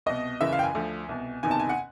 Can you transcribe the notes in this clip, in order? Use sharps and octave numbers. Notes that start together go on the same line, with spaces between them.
C2 B2 D#5
F#1 F#2 C#3 E3 E5
F5
G5
G#5
D2 D3 F3
C2 B2
F#1 E2 C3 D#3 G#5
A5
G#5
F#5